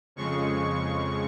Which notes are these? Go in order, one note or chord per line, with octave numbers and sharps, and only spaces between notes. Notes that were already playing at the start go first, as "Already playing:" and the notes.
F2 C#3 G#3 C#6